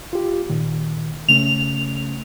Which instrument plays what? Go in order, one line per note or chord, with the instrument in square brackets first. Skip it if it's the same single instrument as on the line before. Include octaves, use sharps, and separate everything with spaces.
[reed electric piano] F4 G4
A#2 D#3
[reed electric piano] C#3 A3 C#4 [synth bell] F7